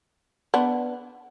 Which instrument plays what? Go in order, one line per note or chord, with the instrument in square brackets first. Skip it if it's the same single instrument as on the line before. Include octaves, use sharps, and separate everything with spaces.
[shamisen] B3 D4